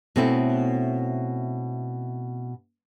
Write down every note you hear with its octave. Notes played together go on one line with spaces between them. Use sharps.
B2 A3 C4 C#4 E4